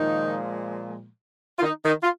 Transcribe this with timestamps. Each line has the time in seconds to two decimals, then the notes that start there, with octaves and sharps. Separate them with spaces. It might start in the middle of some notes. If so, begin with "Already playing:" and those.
Already playing: A#2 D#3 F3 G#3 D#4
1.58 F4
1.61 D#3 D#4
1.84 D#3 D#4
2.02 F4